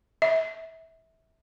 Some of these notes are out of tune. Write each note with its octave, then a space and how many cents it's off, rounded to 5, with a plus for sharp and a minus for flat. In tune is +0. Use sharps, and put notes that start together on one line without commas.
E5 -20